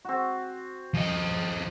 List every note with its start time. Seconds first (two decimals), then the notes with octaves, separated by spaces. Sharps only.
0.05 C4 F#4
0.94 F3 D#5